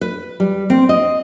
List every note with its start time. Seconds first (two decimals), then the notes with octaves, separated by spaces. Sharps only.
0.01 B4
0.40 G3
0.70 C4
0.89 D#5